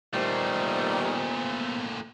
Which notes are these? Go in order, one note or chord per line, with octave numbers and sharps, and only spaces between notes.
A#2 D#3 G3 A3 B3 C5